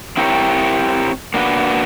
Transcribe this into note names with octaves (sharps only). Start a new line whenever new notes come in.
C4 E4 G4 A#4 C#5
A#3 D4 F#4 B4